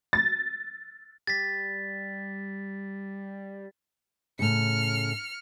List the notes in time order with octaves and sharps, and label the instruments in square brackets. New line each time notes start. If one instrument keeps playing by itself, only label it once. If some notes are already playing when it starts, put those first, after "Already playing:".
[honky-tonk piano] A6
[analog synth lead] G3 [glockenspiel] A6 B6
[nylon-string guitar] A2 C#3 [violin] F6 C#7